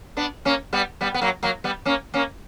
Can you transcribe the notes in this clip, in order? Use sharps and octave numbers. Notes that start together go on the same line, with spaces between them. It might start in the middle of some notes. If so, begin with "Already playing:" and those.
B3 D4
A#3 C#4
G3 B3
G3 B3
B3
F#3 A#3
F#3 A#3
G3 B3
A#3 C#4
A#3 C#4